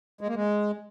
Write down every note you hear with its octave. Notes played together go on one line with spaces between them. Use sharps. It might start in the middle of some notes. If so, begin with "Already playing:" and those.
G#3
A#3
G#3